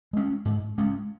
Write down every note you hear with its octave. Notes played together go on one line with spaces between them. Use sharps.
G#3 C#4
G#2
G#3 C#4